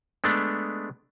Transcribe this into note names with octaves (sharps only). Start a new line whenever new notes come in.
G#3 A3 B3 D4